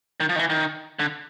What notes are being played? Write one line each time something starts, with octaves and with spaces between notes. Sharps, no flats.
D#3
F3
D#3
E3
D#3
D3